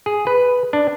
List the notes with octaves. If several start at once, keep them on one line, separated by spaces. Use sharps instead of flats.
G#4
B4
D4